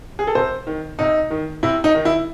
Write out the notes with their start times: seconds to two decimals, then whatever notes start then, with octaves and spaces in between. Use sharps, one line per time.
0.19 G#4
0.27 A4
0.35 C3 C5
0.67 D#3
0.99 C3 D#4
1.30 D#3
1.63 C3 E4
1.84 D#4
1.95 D#3
2.05 E4